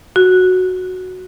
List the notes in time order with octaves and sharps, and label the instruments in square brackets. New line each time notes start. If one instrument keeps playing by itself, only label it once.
[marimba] F#4